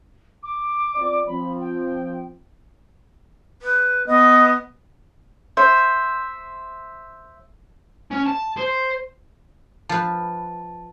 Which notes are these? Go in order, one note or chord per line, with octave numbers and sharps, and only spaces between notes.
D6
C4 F4 D5
F3 C4 B5
G5
B4
B3 D#5
C5 E5
C#4
A5
C5
F3 B4 A5